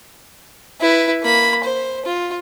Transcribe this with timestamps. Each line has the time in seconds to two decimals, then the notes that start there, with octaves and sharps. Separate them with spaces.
0.81 E4 B4
1.23 A#3 B5
1.64 C5
2.05 F4